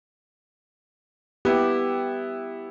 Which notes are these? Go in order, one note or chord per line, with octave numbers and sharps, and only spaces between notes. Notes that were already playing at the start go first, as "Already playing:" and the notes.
B3 E4 G4